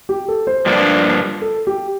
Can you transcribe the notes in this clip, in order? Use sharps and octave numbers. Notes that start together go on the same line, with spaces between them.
G4
A4
C5
G2 F3 A#3 D4
A4
G4